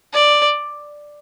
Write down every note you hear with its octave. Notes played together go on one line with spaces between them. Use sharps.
D5